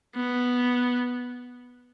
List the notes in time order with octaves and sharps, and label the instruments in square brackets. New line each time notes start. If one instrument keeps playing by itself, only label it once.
[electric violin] B3